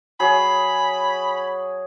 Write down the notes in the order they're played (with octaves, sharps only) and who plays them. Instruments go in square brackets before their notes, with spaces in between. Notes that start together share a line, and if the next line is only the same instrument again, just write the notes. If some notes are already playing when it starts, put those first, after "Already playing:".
[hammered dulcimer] F#3 G#4 [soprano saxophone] B5